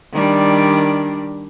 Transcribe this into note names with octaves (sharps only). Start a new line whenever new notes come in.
D#3 G3 D4